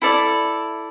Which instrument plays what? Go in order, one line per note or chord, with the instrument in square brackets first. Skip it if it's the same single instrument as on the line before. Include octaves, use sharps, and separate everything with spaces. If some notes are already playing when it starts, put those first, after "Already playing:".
[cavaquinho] E4 A4 D5